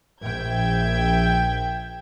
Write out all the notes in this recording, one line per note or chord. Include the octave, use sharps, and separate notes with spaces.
A#1 E5 G5 G#6